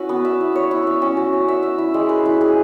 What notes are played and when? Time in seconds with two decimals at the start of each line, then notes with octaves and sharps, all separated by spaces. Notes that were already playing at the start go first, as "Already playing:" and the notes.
Already playing: C#4 E4 F#4 B4
0.09 B3
0.25 E5
0.41 E4
0.55 C#5
0.71 E4
0.87 E5
1.02 C#4
1.17 F#4
1.33 C#4
1.48 E5
1.63 E5
1.78 E4
1.94 G#3
2.09 B4
2.25 E4
2.41 G#4